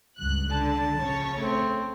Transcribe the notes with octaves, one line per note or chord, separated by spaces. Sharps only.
C#2 G2 F#6
D3 A5
A#1 C#3 C#5
A3 C4